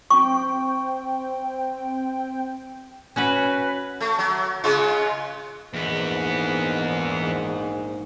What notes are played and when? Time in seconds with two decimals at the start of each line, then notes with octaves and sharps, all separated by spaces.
0.10 C4 G5 C#6
3.16 C#4 F#4 B4
4.00 A3
4.19 F#3
4.64 C#3 G#3 F4
5.74 A#1 E2 G#2 B3